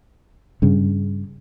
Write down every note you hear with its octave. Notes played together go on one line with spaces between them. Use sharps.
G2 C#3